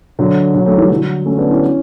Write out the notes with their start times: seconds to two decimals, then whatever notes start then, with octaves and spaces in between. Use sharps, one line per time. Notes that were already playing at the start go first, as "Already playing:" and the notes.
0.19 D3 F#3
0.54 D3 F#3
0.66 F#3 A3
0.78 E3 G3
0.90 D3 F#3
1.26 A3 C#4
1.38 B3 D4
1.49 C#4 E4